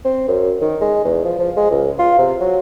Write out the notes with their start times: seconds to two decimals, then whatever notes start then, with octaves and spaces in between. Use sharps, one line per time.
0.05 C4
0.28 F#2
0.61 D#3
0.81 G#3
1.04 E2
1.24 F3
1.39 F3
1.56 G#3
1.71 C#2
1.99 F4
2.18 C3
2.40 F#3